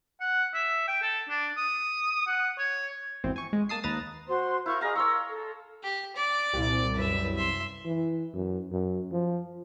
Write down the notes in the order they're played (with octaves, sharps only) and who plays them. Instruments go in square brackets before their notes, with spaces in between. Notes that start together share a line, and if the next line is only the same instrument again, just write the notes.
[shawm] F#5
E5
G5
A4
D4
D#6
F#5
C#5
[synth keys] G#1 E2 C4 C5
G#5 C#6
G#3
A#3 A5 D#6 C7
D#2 B4 A#5 D#6 A6
[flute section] F#4 C5 C6
[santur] E4 F5 [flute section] A#4 C#6 G6
[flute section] G#4 D#5 [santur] F5 A#5
[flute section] A#4 E6 [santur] C#5 C6 C#6
[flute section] A4
[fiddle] G4
D5 D6
[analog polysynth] C2 [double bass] A#2
[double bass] F#2 [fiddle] B4 E5
[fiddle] E5 C6
[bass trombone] E3
F#2
F#2
F3